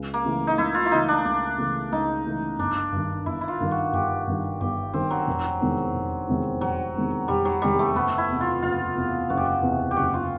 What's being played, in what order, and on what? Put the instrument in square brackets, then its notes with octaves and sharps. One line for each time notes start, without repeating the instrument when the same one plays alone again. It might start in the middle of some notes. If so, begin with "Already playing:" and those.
Already playing: [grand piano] C#2
[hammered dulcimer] A#3
[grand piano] C#3 E3 A3
[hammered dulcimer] D#4
[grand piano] C#2 [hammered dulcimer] E4
[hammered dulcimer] F4
E4
[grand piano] C#3 E3 A3 [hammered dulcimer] D#4
[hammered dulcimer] D4
[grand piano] C#2
C#3 E3 A3
[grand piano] C#2 [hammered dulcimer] D#4
[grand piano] C#3 E3 A3
[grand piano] G1 [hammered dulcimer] D4
[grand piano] G2 D#3
[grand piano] G1 [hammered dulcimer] E4
[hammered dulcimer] E4
F4
[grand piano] G2 D#3
[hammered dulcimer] F#4
[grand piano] G1 [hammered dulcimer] G4
[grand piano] G2 D#3
[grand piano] G1 [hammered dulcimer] G4
[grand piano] G2 D#3 [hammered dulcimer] C4
[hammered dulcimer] F#3
[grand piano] F1
E2 C3 D#3 G#3
F1
E2 C3 D#3 G#3
[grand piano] F1 [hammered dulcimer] F#3
[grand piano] E2 C3 D#3 G#3
[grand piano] F1 [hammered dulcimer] G3
[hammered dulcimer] F#3
[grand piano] E2 C3 D#3 G#3 [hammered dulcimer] G3
[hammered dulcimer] A3
[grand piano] F#1 [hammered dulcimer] B3
[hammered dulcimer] E4
[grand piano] E2 C3
[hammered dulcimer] F4
[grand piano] F#1 [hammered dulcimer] F4
[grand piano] E2 C3
[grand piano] F#1 [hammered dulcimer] F#4
[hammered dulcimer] G4
F#4
[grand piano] E2 C3
[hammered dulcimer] G4
[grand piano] F#1 [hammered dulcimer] F#4
[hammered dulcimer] F4